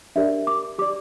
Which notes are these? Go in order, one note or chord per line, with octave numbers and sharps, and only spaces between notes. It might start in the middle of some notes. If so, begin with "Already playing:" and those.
D4 G4 A#4 D5 E5
D6
G4 D5 D6